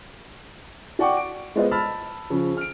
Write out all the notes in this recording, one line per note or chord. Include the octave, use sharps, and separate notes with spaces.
F#4 D5 F#5 G5 C#6 D6
D7
G#3 B3 F4 C5 D#5
A5 B5 E6 F6 A6
C#3 F3
F6 D7